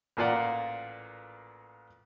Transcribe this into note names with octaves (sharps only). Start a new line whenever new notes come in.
A1 A#2 A#3 F4 D5 F#5